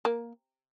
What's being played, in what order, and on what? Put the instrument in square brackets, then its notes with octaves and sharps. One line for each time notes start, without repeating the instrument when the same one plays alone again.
[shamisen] A#3